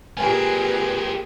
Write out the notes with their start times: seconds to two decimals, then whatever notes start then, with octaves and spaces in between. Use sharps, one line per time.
0.17 A#2 C4 G4 G#4 A#4 B4 G#5